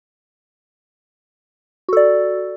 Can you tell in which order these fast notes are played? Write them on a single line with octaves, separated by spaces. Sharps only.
F#4 A4 D5